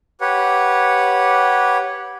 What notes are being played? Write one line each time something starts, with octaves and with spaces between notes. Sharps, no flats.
G4 B4 C#5 F#5